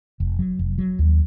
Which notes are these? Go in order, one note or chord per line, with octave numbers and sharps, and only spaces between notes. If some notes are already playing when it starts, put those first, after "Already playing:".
F1
F#3
F1
F#3
D#2